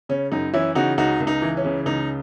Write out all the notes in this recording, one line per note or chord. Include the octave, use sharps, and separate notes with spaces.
C#3 C#4
F#2 D#4
E3 C#4 E4
C#3 D#4 F#4
C#2 D#4 F#4
C#2
D#4
E3
C#4
C#3
C#2 D#4